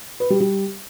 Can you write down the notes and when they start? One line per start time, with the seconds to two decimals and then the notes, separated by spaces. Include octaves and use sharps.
0.20 B4
0.30 G3
0.40 G3